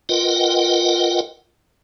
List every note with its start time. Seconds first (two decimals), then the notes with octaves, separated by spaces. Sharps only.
0.09 F4 A#4 B4 D#5 F#5 G5